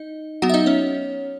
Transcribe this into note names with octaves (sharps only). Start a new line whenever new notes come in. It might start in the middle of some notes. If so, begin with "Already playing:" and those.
Already playing: D#4 D#5
F#3 B3 F#4 F#5
E5
D#4 D#5
C#4 C#5